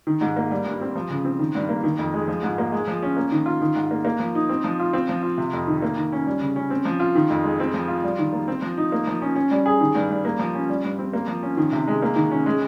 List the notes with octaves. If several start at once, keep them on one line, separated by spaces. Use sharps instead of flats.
D#3
G#2
A#3
G3
G2
C4
F3
C#3
C4
D#3
G2
A#3
D#3
F2
G#3
F3
G#2
A#3
G#3
F3
C#4
A#3
D#3
F4
D#3
G#2
A#3
A#3
F3
D#4
C4
F3
F4
C4
F3
F4
C3
F2
D#3
A#3
D#3
C#4
G3
C#3
C#4
C4
F3
F4
D#3
F2
G#3
C4
F3
F4
G3
D#3
A#3
C4
F3
D#4
A#3
F3
C#4
C#4
G3
G#4
D#3
G2
G3
A#3
F3
C#4
G3
G2
C4
A#3
F3
C#4
D#3
C3
G#3
A#3
D#3
C#4
G#3